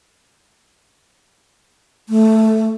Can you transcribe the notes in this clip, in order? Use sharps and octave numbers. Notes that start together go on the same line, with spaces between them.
A3